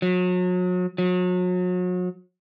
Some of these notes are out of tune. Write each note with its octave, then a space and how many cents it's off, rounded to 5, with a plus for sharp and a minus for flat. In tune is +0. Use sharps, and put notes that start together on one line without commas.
F#3 -35
F#3 -35